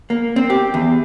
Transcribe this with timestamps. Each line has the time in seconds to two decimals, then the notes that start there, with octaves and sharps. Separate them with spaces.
0.10 A#3
0.36 C4
0.50 G4
0.74 E2